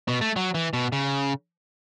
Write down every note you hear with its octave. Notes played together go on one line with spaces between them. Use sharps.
B2
A3
F#3
E3
B2
C#3